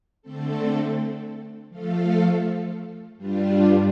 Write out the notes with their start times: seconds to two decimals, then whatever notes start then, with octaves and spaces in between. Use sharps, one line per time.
0.22 D3 A3 C4 A4
1.70 F3 A3 F4 A4
3.17 G2 G3 D4 F4